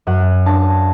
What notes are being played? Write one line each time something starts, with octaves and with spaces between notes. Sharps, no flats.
F#2 F#5
D4 A5